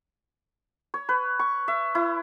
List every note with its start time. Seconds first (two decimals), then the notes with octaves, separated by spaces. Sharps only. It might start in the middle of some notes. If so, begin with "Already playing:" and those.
0.94 C#5
1.09 B4
1.39 C#6
1.68 E5
1.95 E4